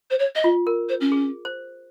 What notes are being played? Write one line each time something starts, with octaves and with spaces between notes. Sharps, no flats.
C5
C#5
D#5
F4
A#4
C5
C#4
G#4
C5